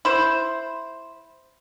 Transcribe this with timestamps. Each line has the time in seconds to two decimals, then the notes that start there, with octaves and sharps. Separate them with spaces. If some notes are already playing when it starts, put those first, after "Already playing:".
0.05 E4 C5